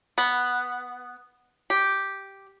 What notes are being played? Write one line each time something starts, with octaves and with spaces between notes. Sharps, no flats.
B3
G4